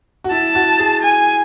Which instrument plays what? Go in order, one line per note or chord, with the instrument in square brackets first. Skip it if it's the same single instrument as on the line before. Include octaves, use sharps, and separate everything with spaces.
[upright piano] F#4
[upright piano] E4 [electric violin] A5
[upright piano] F#4
G#4
[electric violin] G#5